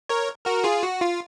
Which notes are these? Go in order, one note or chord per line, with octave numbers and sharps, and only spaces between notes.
A#4 C#5
F#4 A#4
F4 G#4
F#4
F4